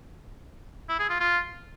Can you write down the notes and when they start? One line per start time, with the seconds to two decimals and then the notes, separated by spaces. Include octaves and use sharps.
0.89 E4
0.99 G#4
1.10 F4
1.20 F4